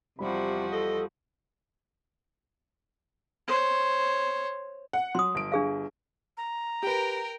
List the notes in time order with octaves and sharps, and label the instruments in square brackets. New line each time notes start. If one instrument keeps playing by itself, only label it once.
[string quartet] E2 F3 F#4 [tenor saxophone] C3 [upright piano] G3 B5
[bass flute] A4 [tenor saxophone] D#5
[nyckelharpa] C5 C#5
[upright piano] F#5
[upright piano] F#3 [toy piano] C6 D#6
[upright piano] G1 D7
[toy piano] D4 G#4 F5
[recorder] A#5
[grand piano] G4 B4 [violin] A#4 G5